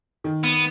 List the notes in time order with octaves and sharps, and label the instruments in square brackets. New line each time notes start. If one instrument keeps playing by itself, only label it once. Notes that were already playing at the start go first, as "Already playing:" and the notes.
[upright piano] D#3
[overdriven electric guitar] B3